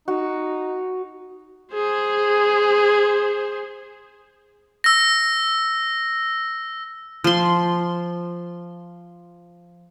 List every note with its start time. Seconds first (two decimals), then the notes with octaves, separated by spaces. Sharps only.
0.08 D#4 F#4
1.74 G#4 C5
4.84 E6 A#6
7.24 F3 C6